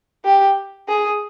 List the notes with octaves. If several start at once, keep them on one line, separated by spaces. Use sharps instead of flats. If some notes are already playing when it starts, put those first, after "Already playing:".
G4
G#4